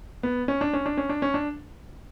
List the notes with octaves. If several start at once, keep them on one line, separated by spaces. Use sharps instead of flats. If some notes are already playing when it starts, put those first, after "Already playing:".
B3
C#4
D4
C#4
D4
C#4
D4
C#4
D4